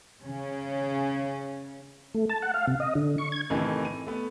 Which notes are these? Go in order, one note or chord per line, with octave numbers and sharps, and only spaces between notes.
C#3 C#4
A3
A5
F#5
F5
C3
D#5
D3
C#6
G#6
F2 A2 C3 D#3 E3
D#7
A3 B3